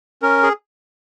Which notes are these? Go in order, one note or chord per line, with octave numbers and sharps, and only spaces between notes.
C#4 A#4
G#4